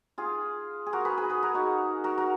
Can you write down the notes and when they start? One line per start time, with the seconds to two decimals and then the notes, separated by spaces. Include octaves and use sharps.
0.18 F4 G#4
0.86 G#4
0.93 F#4 A#4
1.05 G#4 B4
1.17 G#4 B4
1.30 G#4 B4
1.43 F#4 A#4
1.54 D#4 F#4
2.04 F#4 A#4
2.18 F#4 A#4